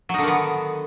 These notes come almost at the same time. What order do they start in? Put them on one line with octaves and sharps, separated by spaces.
F#3 D#4 D3 D#3 B3